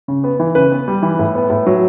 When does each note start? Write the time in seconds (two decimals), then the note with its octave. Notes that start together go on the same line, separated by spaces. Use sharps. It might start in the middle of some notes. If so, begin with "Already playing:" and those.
0.08 C#3
0.24 B3
0.39 E3
0.55 C#3 B4
0.72 B3
0.88 G3
1.02 E3
1.19 A2
1.35 B3
1.50 A2
1.66 F#3